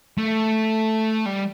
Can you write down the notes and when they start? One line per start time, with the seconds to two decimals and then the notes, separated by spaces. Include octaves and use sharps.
0.18 A3
1.26 G3